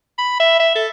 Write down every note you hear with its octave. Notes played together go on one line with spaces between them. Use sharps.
B5
E5
E5
A4